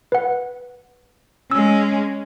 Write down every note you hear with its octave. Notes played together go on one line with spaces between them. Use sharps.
B4 F#5
G#3 C#4 E6